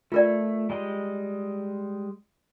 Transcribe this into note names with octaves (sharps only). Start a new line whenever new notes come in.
A3 F4 A#4 D5
G3 G#3 D#5